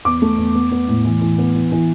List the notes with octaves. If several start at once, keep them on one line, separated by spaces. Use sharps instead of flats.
E2 D6
A3
E2
B3
B3
A2
E3
E3
B3
E3
E3